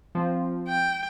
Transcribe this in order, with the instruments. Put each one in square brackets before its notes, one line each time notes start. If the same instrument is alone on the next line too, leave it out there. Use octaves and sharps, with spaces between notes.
[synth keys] F3 C4
[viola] G5